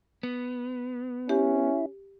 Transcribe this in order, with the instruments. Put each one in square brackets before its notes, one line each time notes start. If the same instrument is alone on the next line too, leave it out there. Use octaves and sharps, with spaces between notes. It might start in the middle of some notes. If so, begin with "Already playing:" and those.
[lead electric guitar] B3
[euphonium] C#4 [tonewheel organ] E4 [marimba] G4